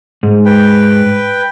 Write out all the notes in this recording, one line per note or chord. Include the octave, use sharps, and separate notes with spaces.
G#2
B4 G5